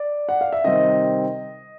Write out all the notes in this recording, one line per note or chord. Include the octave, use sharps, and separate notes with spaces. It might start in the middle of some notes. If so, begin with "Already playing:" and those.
Already playing: D5
F#5
F5
E5
C3 D#3 G3 C4 D#5